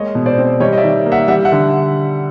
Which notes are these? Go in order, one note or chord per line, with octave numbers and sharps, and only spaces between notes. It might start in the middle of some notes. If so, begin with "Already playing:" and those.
Already playing: G#3 A#3 C#5 D#5
B2
C5 D5
C4
G3 C#5 D#5
D#5
D5 E5
D#3
A#3
E5 F#5
G3 E5 F#5
E5 F#5
D3